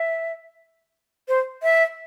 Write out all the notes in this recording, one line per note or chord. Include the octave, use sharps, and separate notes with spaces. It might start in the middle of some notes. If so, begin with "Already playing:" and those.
Already playing: E5
C5
E5